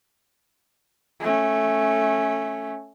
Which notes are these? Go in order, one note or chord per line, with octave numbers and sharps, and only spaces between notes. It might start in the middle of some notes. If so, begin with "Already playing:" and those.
A3 C#4